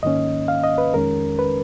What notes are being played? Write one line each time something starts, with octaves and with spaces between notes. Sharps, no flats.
G#2 D#3 A#3 C#4 D#5
F5
D#5
B4
F2 D#3 G#3 C#4 A#4
B4